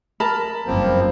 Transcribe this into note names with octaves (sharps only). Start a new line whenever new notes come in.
A#4 A5 B5
F#1 G2 F3 A#3 C4